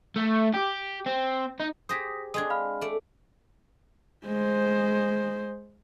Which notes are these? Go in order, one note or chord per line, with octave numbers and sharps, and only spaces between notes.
A3
G4
C4
D#4
G4 G#4 C5 D#6 A#6 B6
G#3 C4 D4 D#6 G#6
F5 B5 F6
A3 D5
G#3 C5